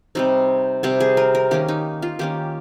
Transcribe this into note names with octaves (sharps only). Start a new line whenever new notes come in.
C3 G3 C4 D#4
C3 G3 C4 G4
G#4
A#4
A#4
D#3 A#3 C#4 G4
D#4
F4
D#3 A#3 C#4 G4